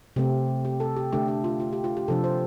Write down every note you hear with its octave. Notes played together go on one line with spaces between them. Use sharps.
C3 A3 C4 G4
G4
A4
G4
D3 A3 D4 G4
G4
F4
F4
G4
F4
G4
C3 F3 D4 A4
C5